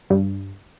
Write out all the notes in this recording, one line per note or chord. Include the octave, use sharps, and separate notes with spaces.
G2